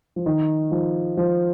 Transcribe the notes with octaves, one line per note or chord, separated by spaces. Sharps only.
F3
D#3
F3
F3